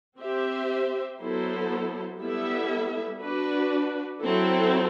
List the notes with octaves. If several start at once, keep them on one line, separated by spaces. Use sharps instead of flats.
C4 G4 C5 E5
F#3 B3 E4 A4 C5
G3 B3 E4 A4 E5
D4 F#4 B4
F#3 C4 E4 A4